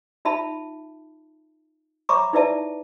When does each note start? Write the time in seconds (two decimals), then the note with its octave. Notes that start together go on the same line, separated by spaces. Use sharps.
0.25 D#4 F4 E5 A5 B5
2.09 C#5 E5 A#5 B5 C#6 D6
2.33 D#4 E4 B4 D5 E5 A5